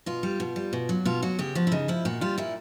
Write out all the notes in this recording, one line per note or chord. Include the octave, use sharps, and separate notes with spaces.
B2 F4
G3
B2
G3
B2
F#3
B2 F4
F#3 F#4
C#3 G4
F3 F#4
E4
C#3 D#4
F3 E4
A#2 F#4
G3 F4
A#2 E4